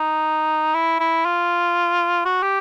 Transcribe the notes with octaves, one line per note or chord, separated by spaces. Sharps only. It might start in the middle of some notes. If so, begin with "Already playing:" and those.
Already playing: D#4
E4
E4
F4
F#4
G4